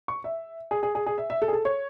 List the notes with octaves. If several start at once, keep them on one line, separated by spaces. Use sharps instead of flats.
C#6
E5
G#4
G#4
G#4
G#4
E5
E5
A4
G#4
A4
C#5